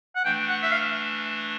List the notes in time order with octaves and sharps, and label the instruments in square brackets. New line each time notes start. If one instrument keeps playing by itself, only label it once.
[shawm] F#5
[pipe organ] E3 A3 D4 [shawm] G5
[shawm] F#5
E5
F5